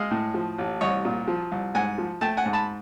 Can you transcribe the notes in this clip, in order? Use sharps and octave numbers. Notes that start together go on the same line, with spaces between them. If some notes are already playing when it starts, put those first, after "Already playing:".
Already playing: G#3 D#5 F5
A2
F3
A1
C2 C#5 D#5
A#2
F3
C2
G#2 F#5 G#5
F3
A3 G5 A5
F#5 G#5
G#2
A5 B5